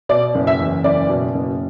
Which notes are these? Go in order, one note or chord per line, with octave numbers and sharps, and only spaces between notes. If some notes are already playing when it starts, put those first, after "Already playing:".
B2 D5
F#1
E5
E2
F#1 D5
B2
F#1